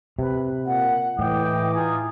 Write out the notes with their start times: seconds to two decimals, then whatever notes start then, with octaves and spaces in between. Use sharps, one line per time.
0.19 C3 B4
0.65 A#2 F#5
1.19 A2 E3 D#5 G5 D6
1.73 D#4 F4 G#4